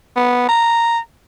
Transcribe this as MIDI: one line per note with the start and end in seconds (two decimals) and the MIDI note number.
0.16 0.48 59
0.49 0.99 82